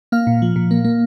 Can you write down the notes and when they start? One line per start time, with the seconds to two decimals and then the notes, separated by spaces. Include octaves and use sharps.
0.12 A#3 F5 F6
0.27 A#2
0.42 F3
0.56 A#2
0.71 A#3
0.85 A#3